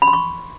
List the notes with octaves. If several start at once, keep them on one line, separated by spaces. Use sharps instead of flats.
B5
C6
C#6